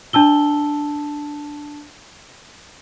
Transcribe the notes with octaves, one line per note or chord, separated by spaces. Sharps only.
D4 A5 E6 G7